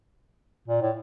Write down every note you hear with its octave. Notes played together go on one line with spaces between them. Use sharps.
A#2
A2